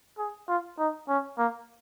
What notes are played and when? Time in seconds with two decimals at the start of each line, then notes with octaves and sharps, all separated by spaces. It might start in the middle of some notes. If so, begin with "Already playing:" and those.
0.18 G#4
0.48 F4
0.79 D#4
1.09 C#4
1.38 A#3